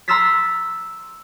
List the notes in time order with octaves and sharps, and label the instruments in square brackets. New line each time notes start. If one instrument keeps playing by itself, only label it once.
[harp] A#5 C6 E6 F6 A6 B6